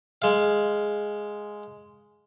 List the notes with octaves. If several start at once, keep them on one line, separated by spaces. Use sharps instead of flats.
G#3 F5